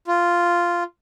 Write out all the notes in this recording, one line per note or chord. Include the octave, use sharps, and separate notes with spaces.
F4